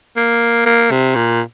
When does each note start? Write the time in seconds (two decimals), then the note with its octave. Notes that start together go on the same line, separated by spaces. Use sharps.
0.17 A#3
0.66 A#3
0.91 C3
1.15 A#2